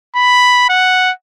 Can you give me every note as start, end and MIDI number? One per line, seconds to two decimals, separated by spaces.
0.16 0.65 83
0.70 1.12 78